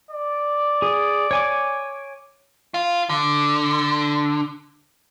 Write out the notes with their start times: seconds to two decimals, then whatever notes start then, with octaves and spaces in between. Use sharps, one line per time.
0.11 D5
0.82 G#4
1.31 C#5 G#5 D6
2.74 F4
3.09 D3